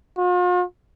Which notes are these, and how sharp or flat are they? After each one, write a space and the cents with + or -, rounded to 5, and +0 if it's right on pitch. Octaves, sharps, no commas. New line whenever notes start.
F4 +45